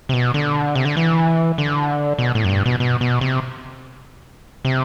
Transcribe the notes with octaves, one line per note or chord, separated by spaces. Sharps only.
C3
B2
D3
C3
D3
E3
D3
B2
A2
F#2
G2
B2
B2
B2
C3
C3